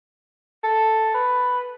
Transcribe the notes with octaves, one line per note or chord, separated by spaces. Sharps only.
A4
B4